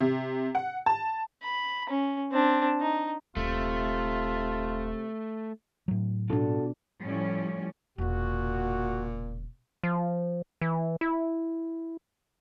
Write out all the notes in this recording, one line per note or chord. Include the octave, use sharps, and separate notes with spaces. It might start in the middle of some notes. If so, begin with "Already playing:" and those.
C3
F#5
A5
B5
C#4
C4 D4
D#4
D#1 C3 A3 F4
A2 F#3
B2 D4 F4 F#4 A4
A2 F3 G3 C#4
E1 A#2 C#3 F#4
F3
E3
E4